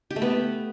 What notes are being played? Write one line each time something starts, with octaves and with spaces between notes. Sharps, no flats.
G4
A3
B3